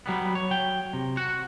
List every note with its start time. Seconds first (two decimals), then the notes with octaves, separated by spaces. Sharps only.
0.06 F#3 G3 B3
0.35 C#5
0.51 F#3 G5
0.93 C3
1.17 F#4 F#5